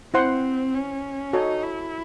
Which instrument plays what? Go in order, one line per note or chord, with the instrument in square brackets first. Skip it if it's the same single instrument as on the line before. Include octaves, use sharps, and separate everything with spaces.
[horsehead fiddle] C4 [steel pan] E4 C5 F#5 C6
[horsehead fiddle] C#4
[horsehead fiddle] D#4 [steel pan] F#4 A4 C#5 G#5
[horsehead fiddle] E4